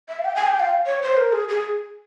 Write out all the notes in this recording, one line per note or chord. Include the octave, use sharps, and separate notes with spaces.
E5
F5
G5
G#5
G5
F5
C#5
C5
A#4
G#4
G#4